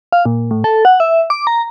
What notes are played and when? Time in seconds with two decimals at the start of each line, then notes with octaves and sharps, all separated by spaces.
0.12 F5
0.26 A#2
0.51 A2
0.64 A4
0.85 F#5
1.00 E5
1.30 D6
1.47 A#5